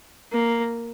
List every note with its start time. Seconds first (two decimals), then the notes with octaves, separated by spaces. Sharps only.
0.32 A#3